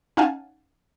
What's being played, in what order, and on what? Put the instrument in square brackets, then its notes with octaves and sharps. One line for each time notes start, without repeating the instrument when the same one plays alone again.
[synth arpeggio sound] C#4 D#4 F5 F#5 G#5 A5